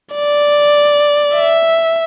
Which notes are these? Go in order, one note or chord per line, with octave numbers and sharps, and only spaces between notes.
D5
E5